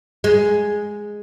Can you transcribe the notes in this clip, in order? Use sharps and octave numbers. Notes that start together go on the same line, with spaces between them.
G#3